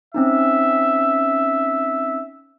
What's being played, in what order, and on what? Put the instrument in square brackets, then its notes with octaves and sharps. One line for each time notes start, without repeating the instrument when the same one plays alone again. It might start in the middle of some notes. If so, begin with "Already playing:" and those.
[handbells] C4 C#4 D#4 [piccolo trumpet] E5